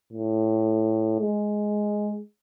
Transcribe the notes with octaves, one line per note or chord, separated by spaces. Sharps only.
A2
G#3